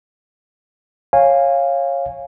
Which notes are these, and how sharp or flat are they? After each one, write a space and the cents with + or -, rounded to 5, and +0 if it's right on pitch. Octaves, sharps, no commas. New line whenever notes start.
C#5 -15 F5 +0 G#5 -15